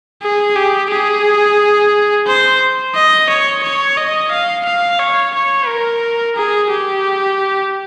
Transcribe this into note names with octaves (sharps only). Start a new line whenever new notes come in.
G#4
G4
G#4
C5
D#5
C#5
C#5
D#5
F5
F5
C#5
C#5
A#4
G#4
G4